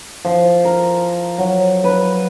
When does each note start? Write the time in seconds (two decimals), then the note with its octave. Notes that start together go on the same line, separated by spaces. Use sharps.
0.25 F3
0.65 A#4
1.38 F#3
1.84 B4